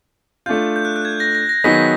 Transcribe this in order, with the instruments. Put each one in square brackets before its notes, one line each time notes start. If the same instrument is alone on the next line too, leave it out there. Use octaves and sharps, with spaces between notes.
[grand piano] A3 D4 F4 [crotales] G6
[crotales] G6
F#6
F#6
G#6
A#6
A#6
A#6
[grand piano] D#3 F#3 B3 D#4 G#4 [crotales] B6